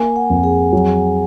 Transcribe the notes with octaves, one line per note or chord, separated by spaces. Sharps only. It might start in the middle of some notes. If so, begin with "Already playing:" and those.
Already playing: A#3 G#5
F#5
F2
G#4
F#3